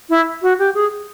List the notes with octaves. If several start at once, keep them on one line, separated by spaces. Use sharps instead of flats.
E4
F#4
G4
G#4